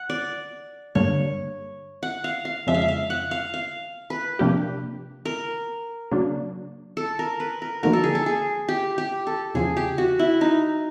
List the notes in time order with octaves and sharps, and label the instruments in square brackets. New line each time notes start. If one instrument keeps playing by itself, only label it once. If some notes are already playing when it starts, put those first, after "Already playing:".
Already playing: [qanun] F#5
D5
[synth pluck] G2 D3 G3 A#3 D4 [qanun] C#5
[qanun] F#5
F5
F5
[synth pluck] F2 C#3 F3 G#3 [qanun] E5
[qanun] F5
E5
F5
F#5
F5
F5
B4
[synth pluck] C3 F3 A#3 D4 G4
[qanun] A#4
[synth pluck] C#3 F#3 A#3 D4
[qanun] A4
A#4
B4
A#4
[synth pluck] D3 F3 A#3 D#4 F#4 [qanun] A#4
[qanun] A4
G#4
A4
G#4
G4
G4
A4
[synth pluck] E2 C#3 F3 [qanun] G#4
[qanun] G4
F#4
E4
D#4